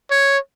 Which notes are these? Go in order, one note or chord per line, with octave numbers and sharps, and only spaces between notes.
C#5